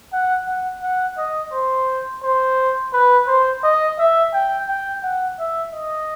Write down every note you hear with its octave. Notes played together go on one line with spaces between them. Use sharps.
F#5
F#5
F#5
D#5
C5
C5
B4
C5
D#5
E5
G5
G5
F#5
E5
D#5